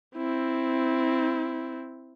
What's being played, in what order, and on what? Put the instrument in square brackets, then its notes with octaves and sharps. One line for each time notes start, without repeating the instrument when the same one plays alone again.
[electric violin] C4 E4